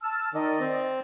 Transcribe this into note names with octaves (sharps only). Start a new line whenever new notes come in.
A5 E6 F6
D#3 D5 D#5
C4